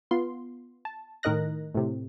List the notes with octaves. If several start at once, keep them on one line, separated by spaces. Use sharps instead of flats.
B3 F4 C6
A5
A2 D#3 A#4 D#5 F#6 A#6
A2 C3